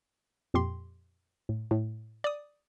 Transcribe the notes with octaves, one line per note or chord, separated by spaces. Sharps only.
F2 A#2 G4 C6
A2
A2
D5 D#6